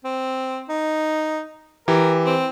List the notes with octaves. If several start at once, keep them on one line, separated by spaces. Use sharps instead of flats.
C4
D#4
E3 G4 A#4
C4